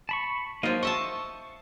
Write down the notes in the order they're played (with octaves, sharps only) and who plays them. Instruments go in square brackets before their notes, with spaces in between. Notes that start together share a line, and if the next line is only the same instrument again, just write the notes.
[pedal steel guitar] A5 B5 C#6
[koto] F3 F4 [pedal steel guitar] F#3 A#3 D#4
[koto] D#5 E5 A5 [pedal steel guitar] C#6